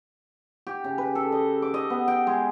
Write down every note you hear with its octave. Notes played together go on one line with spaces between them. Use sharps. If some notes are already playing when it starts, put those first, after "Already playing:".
G4
C#3
B4
A4
D#5
D6
D#5
B3
G5
G#3